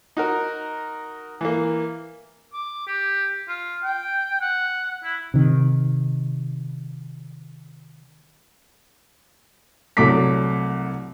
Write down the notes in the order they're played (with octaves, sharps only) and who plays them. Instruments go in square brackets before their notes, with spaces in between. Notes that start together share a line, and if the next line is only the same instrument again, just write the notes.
[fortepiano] D#4 F#4 A#4
E3 A#3
[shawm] D6
G4
F4
G5
F#5
E4
[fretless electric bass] C3 D#3
[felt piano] C2 F#3 A3 D6 B6